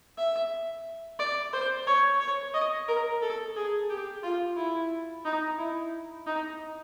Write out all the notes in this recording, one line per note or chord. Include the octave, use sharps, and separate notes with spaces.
E5
D5
C5
C#5
C#5
D#5
A#4
A4
G#4
G4
F4
E4
D#4
E4
D#4